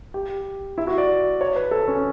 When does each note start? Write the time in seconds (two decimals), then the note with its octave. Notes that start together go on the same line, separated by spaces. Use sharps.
0.14 G4
0.78 E4
0.87 F#4
0.98 D5
1.41 C#5
1.56 B4
1.71 A4
1.88 C#4